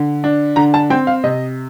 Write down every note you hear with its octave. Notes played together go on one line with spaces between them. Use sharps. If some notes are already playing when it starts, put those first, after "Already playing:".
Already playing: D3
D4
D3 A#5
A5
C4 G5
F5
C3 D#5